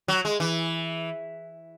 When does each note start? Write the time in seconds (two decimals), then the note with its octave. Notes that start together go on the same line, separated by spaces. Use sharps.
0.08 F#3
0.25 G#3
0.40 E3